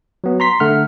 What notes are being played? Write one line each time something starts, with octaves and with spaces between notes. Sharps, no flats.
F#3 B3
A#5 C6 B6
D3 A3 F#5 F6